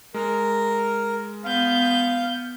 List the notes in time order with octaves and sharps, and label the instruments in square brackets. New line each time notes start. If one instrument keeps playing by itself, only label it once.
[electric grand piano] G#3 [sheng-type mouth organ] A#4
[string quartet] B3 G6 [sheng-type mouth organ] F5